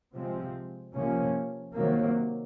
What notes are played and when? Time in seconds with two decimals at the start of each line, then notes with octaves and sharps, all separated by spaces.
0.14 C3 F3 G#3 C4
0.94 C3 F3 A#3 C#4
1.75 C3 D#3 F#3 A#3